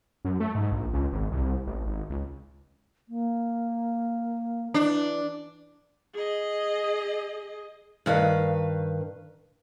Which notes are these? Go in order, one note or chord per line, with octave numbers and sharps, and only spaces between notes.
F#2
A3
G#2
A#1
C#2
G#1
C2
A1
G#1
C#2
A#3
E3 D4
G#4 D#5
G2 D#3 B4 F5